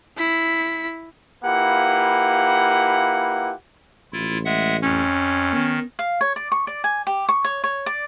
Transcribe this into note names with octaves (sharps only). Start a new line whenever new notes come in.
E4 B6
A#3 E4 F4 G4 B4 F#5
A1 E4 F4
G#3 E5 F#5
F2 C#4
D#3 B3
F5
C#5
D5
C#6
D5
G#5
G4
C#6
C#5
C#5
D5